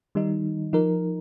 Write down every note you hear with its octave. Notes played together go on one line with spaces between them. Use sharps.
D#3 G3 D#4
F3 D#4 A#4